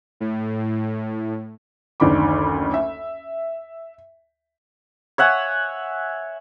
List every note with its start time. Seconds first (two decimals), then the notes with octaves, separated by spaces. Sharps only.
0.20 A2
2.00 F#1 D2 D#3 D4 B5 D6
2.74 E5
5.18 C#5 E5 F#5 G#5